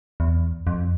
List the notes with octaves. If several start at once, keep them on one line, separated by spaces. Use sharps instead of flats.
E2
F2